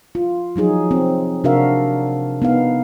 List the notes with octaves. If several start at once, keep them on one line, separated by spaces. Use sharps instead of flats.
F4
F3 F#3 D#4 G#4
C4
C3 D4 F#4 A#4 E5 F5
B3 D#4 F5